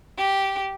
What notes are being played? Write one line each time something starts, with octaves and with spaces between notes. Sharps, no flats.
G4